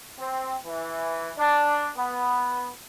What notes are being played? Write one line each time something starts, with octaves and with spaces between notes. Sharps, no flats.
C4
E3
D4
B3